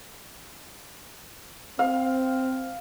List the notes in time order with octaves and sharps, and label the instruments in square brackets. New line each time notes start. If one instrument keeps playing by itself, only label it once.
[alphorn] C4 [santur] F5